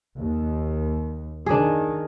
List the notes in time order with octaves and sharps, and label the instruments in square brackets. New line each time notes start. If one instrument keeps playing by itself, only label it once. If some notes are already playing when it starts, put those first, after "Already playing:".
[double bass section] D#2
[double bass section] D#3 [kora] D4 G#4